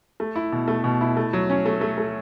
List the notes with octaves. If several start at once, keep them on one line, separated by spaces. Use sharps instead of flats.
A3
E4
B2
A3
B2
E4
A3
F#3
C#4
A3
A3
A3